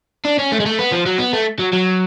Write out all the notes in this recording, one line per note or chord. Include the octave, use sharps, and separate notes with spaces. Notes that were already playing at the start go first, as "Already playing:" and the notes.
D4
C#4
A3
G#3
A3
B3
F3
F#3
B3
A3
F#3
F#3